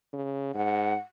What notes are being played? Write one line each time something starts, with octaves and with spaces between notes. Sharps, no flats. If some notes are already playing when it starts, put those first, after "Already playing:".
C#3
G#2 F#5